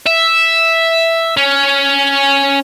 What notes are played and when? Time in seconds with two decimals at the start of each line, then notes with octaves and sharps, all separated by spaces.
0.06 E5
1.37 C#4